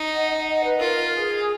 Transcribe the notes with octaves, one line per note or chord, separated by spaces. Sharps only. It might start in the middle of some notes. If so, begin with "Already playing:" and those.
Already playing: D#4
D#5 F#5
D#5 F#5
B4
F4 A#4
G#4